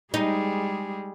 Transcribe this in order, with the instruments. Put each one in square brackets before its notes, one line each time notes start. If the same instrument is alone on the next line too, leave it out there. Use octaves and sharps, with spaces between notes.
[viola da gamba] G3 G#3 G#4 [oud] D#4